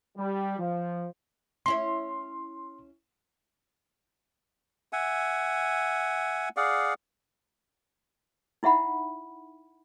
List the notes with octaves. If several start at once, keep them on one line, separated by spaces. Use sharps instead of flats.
G3
F3
C#4 E4 C#5 C6
E5 F#5 G#5
G#4 D5 F5 F#5
D#4 E4 E5 F#5 B5